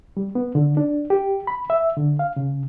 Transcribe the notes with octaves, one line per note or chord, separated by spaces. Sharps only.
G3
B3
D3
D4
G4
B5
E5
D3
F5
C#3